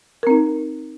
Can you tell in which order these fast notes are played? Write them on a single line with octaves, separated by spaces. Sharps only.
A#4 C4 D#4